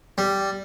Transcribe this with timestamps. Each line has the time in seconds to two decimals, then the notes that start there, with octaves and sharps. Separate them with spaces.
0.18 G3